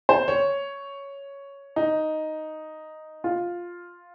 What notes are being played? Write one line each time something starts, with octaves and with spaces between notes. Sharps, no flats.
C5
C#5
D#4
F4